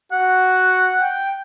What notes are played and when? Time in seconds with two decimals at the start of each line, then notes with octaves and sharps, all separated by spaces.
0.12 F#4 F#5
1.01 G5